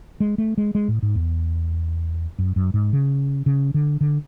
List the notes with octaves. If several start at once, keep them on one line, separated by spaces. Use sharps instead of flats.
G#3
A3
G#3
G#3
A2
G#2
E2
F#2
F#2
G#2
C#3
C#3
D3
D3